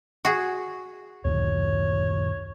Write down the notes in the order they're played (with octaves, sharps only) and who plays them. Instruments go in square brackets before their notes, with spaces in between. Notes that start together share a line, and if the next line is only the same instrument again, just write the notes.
[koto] F#4 G#4
[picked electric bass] D1 [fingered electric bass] F#2 A#2 D#3 [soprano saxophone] C#5